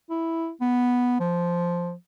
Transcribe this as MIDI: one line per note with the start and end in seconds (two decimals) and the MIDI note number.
0.10 0.51 64
0.61 1.17 59
1.20 1.94 53